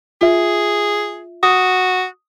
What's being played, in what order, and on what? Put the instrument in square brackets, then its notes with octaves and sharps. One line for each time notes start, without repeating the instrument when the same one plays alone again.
[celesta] F4 E5 [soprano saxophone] G#4
[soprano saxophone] F#4 [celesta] D#6